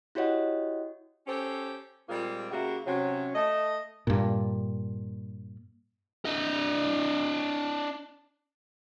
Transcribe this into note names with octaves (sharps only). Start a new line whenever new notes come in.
E4 F#4 G4 C#5 D#5 F#5
C#4 G4 A4 C5
A#2 G3 G#3 A#3 C4 F4
C#3 A#3 F#4 G4 E5
C3 F#3 C#4
A3 D#5
G2 A#2
D4 D#5